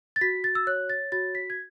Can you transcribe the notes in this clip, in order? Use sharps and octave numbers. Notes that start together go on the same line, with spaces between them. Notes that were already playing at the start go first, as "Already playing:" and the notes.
A6
F#4 B6
A6
E6
C#5 F#6
A6
F#4 A6
B6
G#6